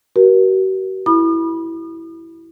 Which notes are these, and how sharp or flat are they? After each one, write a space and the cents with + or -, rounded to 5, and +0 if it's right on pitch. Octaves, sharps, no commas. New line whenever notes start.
F#4 +45 A#4 +35
E4 +0 B5 -20 D#6 -45